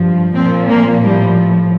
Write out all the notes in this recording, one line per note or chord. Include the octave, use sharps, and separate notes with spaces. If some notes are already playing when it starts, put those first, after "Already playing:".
Already playing: G2 F3
A#2 F3 C4
A#3
A2 F3 G3